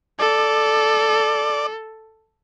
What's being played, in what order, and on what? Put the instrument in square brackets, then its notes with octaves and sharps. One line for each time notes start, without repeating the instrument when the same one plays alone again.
[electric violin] A4 [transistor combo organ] D5